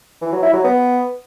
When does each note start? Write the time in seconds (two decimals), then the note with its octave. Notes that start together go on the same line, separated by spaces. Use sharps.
0.21 E3
0.32 F#3
0.43 E4
0.53 F#3
0.64 B3